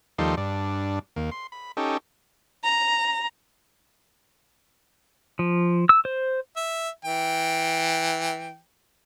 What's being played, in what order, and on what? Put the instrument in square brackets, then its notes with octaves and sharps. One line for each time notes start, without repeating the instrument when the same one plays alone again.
[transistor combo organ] D#2 F3 G3 D#4 A4 C6
G2 D4
D#2 A#3
C6
B5
C#4 D#4 G4 A4
[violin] A#5
[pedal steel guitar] F3
E6
C5
[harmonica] E5
E3 G5